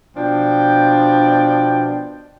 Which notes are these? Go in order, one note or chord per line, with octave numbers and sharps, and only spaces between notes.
B2 F3 D4 G5